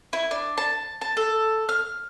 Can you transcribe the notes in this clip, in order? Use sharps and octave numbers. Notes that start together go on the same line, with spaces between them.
E4
D4
A5
A5
A4
F6